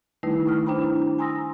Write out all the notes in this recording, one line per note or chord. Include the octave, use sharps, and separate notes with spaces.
D#3 G3 A3 D#4 E4 B4
C#6 D#6 F6
D4 E4 C5 G5 A#5 B5
G#5 A#5 C6 D#6 E6 A#6